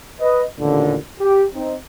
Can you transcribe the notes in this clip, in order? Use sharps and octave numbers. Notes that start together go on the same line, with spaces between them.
B4 D#5
A1 D#2 A#2 D3
G4
C4 D#4